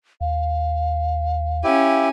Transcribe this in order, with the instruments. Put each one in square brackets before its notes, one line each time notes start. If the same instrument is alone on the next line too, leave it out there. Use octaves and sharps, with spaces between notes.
[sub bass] D#2 [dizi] F5
[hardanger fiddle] C#4 G#5 [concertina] E4 G4